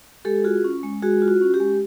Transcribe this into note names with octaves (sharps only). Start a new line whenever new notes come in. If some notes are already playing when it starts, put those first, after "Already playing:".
G#3 G4 A4
F4 F#4 G#4
C#4
G#3
G#3 F#4 G#4
F4
F#4
C#4
G4
G#3